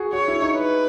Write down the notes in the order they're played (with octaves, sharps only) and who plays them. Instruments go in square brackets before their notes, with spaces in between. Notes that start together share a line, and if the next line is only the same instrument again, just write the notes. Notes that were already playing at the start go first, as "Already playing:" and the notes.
Already playing: [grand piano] F#4 G#4
[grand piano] F#4 [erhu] C#5
[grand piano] E4
D#4
[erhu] B4